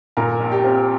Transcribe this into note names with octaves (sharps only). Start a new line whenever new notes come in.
A#2 A#4
A#1
G4
C4